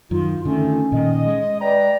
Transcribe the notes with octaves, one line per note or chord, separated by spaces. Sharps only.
F#2 D#3 F4
D3 D#3 A3 C#4
A#2 D#3 D#5
G#3
B4 D5 G5 A#5